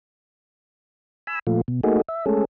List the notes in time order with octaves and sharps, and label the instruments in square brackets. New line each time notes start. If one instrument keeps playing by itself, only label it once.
[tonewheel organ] G#5 B5 E6
A#2 F3 A3 F4
B2
A3 A#3 D#4 F#4 G#4
E5
G#3 A3 C#4 G#4 A4